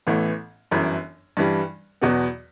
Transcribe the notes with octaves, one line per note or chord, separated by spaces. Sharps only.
A1 A2 E3 B3
G1 F#2 E3
G2 E3 G3
E2 B2 F#3 B3